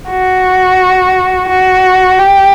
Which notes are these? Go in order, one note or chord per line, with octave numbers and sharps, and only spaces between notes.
F#4
F#4
G4